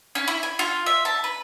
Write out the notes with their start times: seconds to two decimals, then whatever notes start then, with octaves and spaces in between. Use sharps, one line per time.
0.15 C#4
0.28 E4
0.43 G#5
0.59 F4
0.86 E5
1.05 A5
1.24 B4